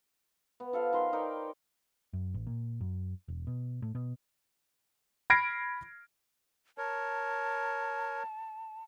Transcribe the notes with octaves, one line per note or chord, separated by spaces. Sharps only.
B3
F3 A4 F5
D#3 B4 A#5 C6
D#4 A#4 D5 G5
F#2
A1
A#2
F#2
E1
B2
A2
B2
B5 F6 G#6 A#6 C7 D7
A#4 C#5 A5